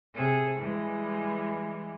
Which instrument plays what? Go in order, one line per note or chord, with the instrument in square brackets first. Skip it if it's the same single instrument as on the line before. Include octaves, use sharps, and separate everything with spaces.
[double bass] C3 [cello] G#4 A4
[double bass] E3 [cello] G3 G#3